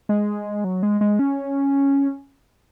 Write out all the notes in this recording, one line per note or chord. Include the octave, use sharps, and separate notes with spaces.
G#3
F#3
G#3
G#3
C#4